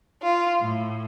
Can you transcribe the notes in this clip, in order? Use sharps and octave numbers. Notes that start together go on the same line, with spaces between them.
F4
A2